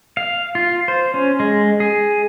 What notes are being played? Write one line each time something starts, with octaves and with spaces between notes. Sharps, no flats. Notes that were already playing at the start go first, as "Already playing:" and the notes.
F5
F4
C5
C#4
G#3
G#4